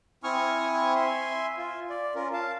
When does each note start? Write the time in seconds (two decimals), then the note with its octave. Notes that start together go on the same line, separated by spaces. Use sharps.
0.24 C4 E4 G#5 C#6 D#6 F6
0.95 E5 G#5 C6
1.57 F4
1.90 D5
2.15 C#4 F4 A#4
2.33 F5 A5